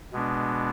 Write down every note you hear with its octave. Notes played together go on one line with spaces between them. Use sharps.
B2 G#3 B3 D4